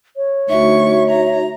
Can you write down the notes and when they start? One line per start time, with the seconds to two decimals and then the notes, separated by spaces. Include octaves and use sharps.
0.16 C#5
0.49 D2 D#4 F#4 E5 C#6
1.10 A#5